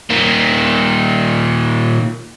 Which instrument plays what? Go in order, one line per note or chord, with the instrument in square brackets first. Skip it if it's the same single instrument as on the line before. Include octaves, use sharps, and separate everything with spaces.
[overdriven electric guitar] A#2 D#3